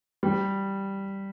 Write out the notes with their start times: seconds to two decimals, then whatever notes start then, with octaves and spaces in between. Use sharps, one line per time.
0.23 G3